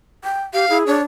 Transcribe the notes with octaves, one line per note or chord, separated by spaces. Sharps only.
G5
G4 F5
E4 G#4
D4 C#5